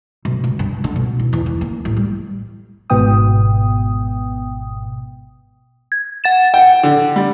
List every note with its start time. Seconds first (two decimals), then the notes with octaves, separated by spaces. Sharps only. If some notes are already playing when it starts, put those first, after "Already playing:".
0.25 B1
0.44 C#2
0.59 G2
0.84 D3
0.96 B2
1.19 E3
1.33 E2
1.46 E2
1.61 A#3
1.85 A1
1.97 G3
2.90 G#1 G#2 B2 B3 G5 D#6
5.92 G#6
6.24 F#5 A6 E7
6.54 F#5 G5
6.83 D3
7.16 G3